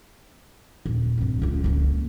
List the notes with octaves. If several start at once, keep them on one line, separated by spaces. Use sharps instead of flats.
D#1
G2 C4
C#2 F4
C#2 A#3